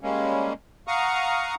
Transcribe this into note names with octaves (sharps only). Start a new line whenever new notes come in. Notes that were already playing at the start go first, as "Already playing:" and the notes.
G3 G#3 A#3 C#4
F5 F#5 A#5 C#6 D#6 F6